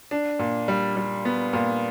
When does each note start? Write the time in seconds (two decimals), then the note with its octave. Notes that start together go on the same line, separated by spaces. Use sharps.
0.11 D4
0.39 A#2
0.68 G3
0.96 G3
1.25 B3
1.53 A#2